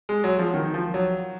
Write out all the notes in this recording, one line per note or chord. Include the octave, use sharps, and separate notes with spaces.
G#3
F#3
F3
D#3
F3
F#3